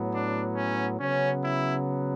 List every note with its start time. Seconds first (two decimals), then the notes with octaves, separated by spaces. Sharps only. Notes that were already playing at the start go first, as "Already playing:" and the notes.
Already playing: A2 F#3 B3
0.13 D4
0.56 C#4
1.00 C#3 F#3 B3 C#4
1.44 E4